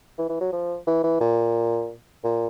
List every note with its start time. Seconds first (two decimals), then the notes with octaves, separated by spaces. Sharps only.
0.18 E3
0.30 E3
0.41 F#3
0.53 F3
0.87 E3
1.04 E3
1.20 A#2
2.24 A#2